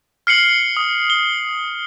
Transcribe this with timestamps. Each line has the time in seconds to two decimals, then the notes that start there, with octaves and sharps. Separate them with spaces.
0.27 F6 C7 C#7 F#7
0.77 D#6
1.10 G7